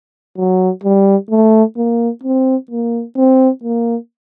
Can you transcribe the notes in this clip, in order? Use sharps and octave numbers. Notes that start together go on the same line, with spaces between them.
F#3
G3
A3
A#3
C4
A#3
C4
A#3